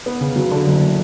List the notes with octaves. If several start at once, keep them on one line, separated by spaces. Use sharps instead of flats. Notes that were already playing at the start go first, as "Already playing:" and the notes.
B3
C#3
F#3
D3
F#1